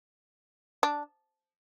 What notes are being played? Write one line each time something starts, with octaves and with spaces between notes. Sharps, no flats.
D4